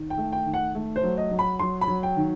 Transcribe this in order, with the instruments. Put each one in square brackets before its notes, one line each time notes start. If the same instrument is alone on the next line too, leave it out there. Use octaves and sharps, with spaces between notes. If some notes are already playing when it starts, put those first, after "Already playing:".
Already playing: [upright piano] D#3
G5
A3
G5
D#3
F#5
A3
C5
F#3
D#5
F#3
B5
F#3 C6
B5
F#3
G5
D#3